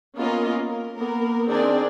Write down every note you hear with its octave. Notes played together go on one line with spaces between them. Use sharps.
A#3 B3 C#4 F4 A#4 D#5
A#4
A#3 B3 A#4
D#3 C4 D4 G#4 A#4 D5